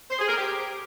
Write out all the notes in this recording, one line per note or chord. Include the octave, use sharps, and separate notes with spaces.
C5
G#4
A#4
G4